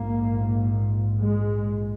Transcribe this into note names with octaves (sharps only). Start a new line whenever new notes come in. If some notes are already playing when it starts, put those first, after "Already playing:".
Already playing: A#1 G#2 A#3
G#3